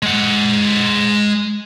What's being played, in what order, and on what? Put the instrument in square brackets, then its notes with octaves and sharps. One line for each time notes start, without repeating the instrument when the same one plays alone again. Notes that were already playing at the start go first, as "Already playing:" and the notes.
[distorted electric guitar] G#3 F#5